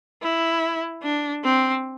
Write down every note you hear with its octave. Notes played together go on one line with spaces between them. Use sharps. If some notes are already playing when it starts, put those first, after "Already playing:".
E4
D4
C4